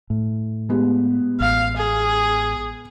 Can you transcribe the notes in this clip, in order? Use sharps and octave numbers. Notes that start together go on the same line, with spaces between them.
A2
G#3 B3 G4
A1 F5
G#4